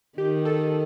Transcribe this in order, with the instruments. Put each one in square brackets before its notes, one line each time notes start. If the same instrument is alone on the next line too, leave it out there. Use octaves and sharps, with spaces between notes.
[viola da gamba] D#3 [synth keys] G4
[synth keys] A4